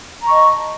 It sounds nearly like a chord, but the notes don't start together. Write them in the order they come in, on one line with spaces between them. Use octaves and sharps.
A#5 C#6 D#5 A5